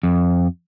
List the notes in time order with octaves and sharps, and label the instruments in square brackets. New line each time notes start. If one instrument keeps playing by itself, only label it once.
[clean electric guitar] F2